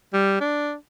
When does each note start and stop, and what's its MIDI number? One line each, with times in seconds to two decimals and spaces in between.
0.13 0.38 55
0.41 0.74 62